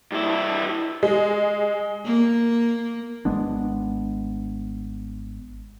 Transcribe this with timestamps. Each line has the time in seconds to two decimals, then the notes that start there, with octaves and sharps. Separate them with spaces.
0.12 G2 E4
1.03 G#3
2.05 A#3
3.25 G#1 G#3 B3 D4